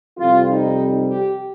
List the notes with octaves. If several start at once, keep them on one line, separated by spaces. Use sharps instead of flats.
F2 C3 G3 F4
D#4
G4